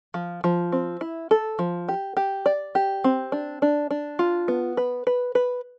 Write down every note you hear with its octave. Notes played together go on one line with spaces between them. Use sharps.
F3
F3
C4
E4
A4
F3
G4
G4
D5
G4
C4
D4
D4
D4
F4
B3
B4
B4
B4